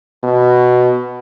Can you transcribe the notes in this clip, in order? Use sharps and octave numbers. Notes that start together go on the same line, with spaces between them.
B2